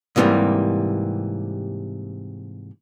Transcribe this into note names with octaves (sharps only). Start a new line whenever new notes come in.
G#2 C3 E3 F3 G3 A#3